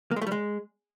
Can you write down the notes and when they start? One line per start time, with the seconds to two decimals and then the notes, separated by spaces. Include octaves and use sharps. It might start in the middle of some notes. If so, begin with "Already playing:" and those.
0.11 A#3
0.16 G#3
0.21 A3
0.27 G3
0.32 G#3